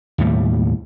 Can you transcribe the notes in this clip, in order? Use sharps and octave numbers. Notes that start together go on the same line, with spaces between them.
D#2 A2 G3